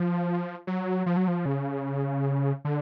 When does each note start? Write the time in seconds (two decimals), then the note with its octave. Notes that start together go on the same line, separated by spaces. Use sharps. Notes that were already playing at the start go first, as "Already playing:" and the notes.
Already playing: F3
0.67 F#3
1.06 F3
1.17 F#3
1.28 F3
1.46 C#3
2.65 D3